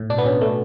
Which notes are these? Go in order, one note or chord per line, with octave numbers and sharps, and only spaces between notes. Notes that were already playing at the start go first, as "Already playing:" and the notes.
Already playing: A2
B2 D4
B3
B2 C#4
B2 A3